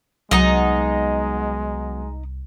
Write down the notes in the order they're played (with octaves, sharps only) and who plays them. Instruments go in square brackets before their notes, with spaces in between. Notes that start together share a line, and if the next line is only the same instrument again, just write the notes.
[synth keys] C2 [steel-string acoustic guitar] F#3 B3 [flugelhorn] G#3 [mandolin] D#4 D#5